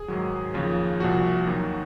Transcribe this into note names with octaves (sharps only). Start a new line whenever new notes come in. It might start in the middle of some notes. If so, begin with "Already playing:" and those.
Already playing: G#4
G#2 D#3 F#3
D#2 C#3 F3
C2 A#2 F3 F#4
D#2 D#3 F#3